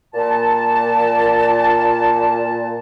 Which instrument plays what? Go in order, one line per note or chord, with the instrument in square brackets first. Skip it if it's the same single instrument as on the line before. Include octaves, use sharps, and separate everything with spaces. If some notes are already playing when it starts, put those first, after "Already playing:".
[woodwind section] A#2 A5